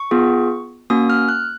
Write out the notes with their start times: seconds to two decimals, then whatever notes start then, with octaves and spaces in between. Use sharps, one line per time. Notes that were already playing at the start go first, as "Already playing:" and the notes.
Already playing: C#6
0.11 B3 F4 G#4
0.90 A#3 C#4 F#4 D#6
1.10 F6
1.29 F#6